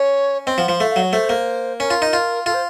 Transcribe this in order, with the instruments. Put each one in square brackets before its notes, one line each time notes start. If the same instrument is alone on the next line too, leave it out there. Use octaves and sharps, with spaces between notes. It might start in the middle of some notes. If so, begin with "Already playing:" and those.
Already playing: [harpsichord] C#4 [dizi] C#5
[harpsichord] C4 [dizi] D#5
[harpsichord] F3 [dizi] F#5
[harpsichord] F3 [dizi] F5
[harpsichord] A3 [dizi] F5
[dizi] F5
[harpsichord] F#3
[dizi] C#5
[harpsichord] A3 [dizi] C5
[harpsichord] A#3
[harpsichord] C#4 [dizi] A#4
[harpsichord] F4
D#4
F4
[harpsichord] F4 [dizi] A4
[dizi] C5